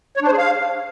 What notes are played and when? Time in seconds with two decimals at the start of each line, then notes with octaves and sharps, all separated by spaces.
0.17 C#5
0.22 D4
0.27 C5
0.33 G#4
0.38 F5